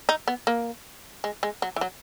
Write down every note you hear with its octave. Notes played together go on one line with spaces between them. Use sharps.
D#4
B3
A#3
G#3
G#3
F#3
E3
F#3